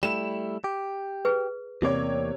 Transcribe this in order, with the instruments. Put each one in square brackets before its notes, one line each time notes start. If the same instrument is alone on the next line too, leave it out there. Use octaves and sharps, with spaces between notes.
[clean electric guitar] G3 A3 E4 [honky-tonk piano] E7
[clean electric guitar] G4
[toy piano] G#4 B4
[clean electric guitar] E2 A#3 D5 [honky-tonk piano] C3 C#5